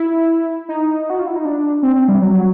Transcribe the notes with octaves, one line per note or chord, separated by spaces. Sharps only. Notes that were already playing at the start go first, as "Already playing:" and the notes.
Already playing: E4
D#4
F#4
F4
E4
D#4
D4
C4
C4
G3
F#3
F#3